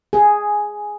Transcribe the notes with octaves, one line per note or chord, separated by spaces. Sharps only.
G#4